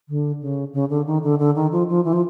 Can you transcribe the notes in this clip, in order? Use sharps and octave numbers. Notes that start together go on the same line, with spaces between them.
D3
C#3
C#3
D3
D#3
D3
D3
D#3
F3
F3
E3
F3